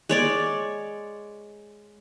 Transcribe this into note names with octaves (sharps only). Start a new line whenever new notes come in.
G#3 C#5 D5